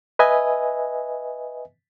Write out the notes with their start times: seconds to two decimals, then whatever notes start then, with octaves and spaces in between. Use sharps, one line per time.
0.19 B4 D#5 E5 G#5